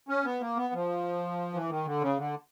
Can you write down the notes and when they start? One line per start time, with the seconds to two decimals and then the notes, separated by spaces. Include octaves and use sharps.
0.09 C#4
0.25 B3
0.41 A#3
0.57 B3
0.73 F3
1.54 E3
1.69 D#3
1.86 D3
2.01 C#3
2.18 D3